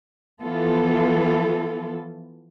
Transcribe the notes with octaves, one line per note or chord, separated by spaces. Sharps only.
E3 F3 B3 F4 A4